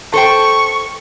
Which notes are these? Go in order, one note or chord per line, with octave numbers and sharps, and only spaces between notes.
A4 C5 G5 C#6